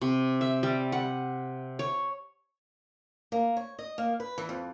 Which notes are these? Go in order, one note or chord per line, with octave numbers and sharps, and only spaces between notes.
C3
E5
G3
F#5
C#5
A#3
C#5
D#5
A#3
B4
E3
F2